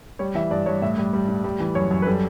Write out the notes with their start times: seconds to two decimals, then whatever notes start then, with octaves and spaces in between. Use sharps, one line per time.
0.19 G3 C#5
0.35 E3 E5
0.51 G2 D5
0.66 G2 C#5
0.82 A2 E5
0.98 G3 D5
1.13 G3
1.28 A2
1.44 G3
1.60 E3
1.75 F#2 C#5
1.91 F#2
2.02 B4
2.07 G3 A4